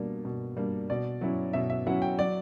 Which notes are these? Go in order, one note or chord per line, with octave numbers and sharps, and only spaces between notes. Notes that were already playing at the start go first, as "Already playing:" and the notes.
Already playing: B2 G3 A#3 D4
B2
G3 A#3 D4
B2 D5
F#3 C#4 E4
B2 E5
E5
F#3 C#4 E4 F#5
G5
F#3 D5